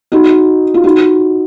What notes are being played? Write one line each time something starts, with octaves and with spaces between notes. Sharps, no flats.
D#4 F#4
F4
D#4 F#4